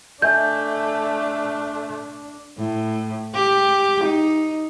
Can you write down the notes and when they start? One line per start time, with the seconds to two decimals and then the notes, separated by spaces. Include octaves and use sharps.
0.22 A3 D4 D#5 E5 G#5 G6
2.58 A2
3.34 G4
4.04 D#4